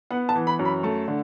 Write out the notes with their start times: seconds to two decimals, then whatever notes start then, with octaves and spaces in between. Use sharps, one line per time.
0.11 B3 F#5
0.29 A5
0.35 E3
0.47 B5
0.59 F#2
0.65 B5
0.83 A3 A5
1.08 D3